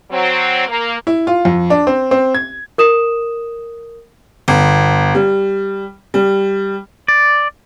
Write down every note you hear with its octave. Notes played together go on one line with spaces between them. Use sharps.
F#3 C4
A#3
E4
F4
F2
D4
C4
C4
G#6
A#4 D#6 E7
G1
G3
G3
D5